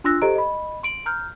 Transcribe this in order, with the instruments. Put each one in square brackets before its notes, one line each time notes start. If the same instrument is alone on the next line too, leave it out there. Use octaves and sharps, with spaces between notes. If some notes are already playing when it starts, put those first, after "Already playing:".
[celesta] D4 F4 C6 E6 F#6 A#6
G4 A4 C5 D#5 A#5 D7
D#5 B5
C6 D7 F#7
A#5 F6 G6